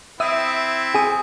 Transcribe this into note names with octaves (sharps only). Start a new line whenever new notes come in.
C4 E4 E5 D#6
G#4 G#5 D#6